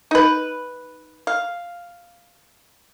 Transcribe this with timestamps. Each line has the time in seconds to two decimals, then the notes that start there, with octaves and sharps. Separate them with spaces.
0.11 D#4 B4
1.27 F5